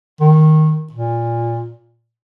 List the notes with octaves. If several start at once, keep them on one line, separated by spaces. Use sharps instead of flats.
D#3
A#2